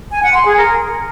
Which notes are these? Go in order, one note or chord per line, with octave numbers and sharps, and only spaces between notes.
G#5
F#5
C6
G#4
A#4